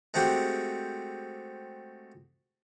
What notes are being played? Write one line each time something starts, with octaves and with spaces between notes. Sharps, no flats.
G#3 A3 C4 F#4 G4